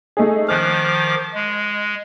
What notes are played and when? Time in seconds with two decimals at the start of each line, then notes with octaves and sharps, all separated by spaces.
0.17 A3 D#4 G#4
0.48 D#3 F3 D6 F6 F#6
1.34 G#3